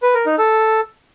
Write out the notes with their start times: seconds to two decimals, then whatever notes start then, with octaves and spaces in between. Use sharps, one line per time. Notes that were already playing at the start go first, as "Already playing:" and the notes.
0.02 B4
0.14 A#4
0.26 D#4
0.38 A4